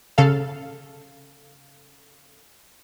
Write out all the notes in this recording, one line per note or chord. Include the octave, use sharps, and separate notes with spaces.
C#3 A4 F5